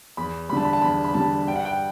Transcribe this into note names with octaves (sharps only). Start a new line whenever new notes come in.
E2 B5
D3 G3 A5 B5
B5
A5
E2 B5
B5
D3 G3 A5
G2 G5
F#5
G5